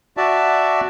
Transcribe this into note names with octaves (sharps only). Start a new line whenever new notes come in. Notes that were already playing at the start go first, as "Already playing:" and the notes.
F#4 D5 E5 A5